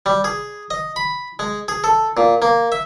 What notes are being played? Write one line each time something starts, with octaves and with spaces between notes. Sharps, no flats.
G3
G#4
D#5
B5
G#3
G#4
A4
A#2
A#3
E5